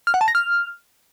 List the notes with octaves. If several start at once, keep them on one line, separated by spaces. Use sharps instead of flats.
F6
F#5
A5
A#6
F6